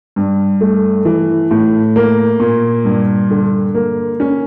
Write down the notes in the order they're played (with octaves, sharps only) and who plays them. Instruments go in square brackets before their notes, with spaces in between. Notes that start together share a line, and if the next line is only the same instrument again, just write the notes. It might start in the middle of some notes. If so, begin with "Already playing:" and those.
[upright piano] G2
A3
E3
A2
A#3
A#2
G2
D3
A#3
C#4